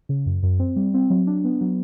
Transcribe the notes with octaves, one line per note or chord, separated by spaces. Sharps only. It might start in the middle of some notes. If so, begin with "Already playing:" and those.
C#3
F#2
F#2
C4
G3
C4
F#3
D4
B3
F#3